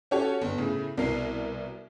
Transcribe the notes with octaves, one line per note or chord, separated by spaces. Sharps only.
C#4 F#4 G4 A4 C#5
G1
A2 C#3
C2 B2 A#4 C7